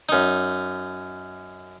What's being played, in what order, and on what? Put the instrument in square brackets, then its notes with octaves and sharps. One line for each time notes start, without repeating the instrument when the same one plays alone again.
[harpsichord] F#2 D#4